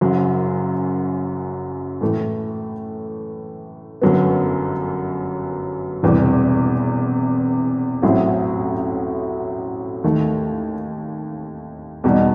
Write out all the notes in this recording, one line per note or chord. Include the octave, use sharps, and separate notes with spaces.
F#1 F#2 F#3
A2 E3 A3
G1 F#2 F#3 B3
E1 E2 C3 E3 G3
A1 A2 F#3 C4 E4
D#2 D#3 A3
E2 B2 G3 D#4